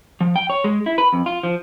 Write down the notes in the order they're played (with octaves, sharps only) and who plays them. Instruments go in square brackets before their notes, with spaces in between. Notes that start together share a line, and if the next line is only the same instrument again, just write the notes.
[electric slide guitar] F3
G5
C#5
G#3
E4
B4
F2
F4
F3